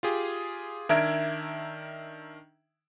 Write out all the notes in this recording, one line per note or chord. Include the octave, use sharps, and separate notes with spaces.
F4 G4 G#4
D#3 D4 A#4 E5 G#6 D7